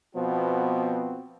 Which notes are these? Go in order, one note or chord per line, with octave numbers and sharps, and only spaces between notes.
B2 F3 B3 C4 F#4